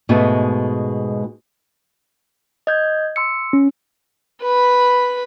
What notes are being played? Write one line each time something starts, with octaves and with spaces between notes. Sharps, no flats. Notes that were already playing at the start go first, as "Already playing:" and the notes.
G#2 B2 G#3 A3
D#5 G6 G#6
C6 E6 C#7
C#4
B4 B5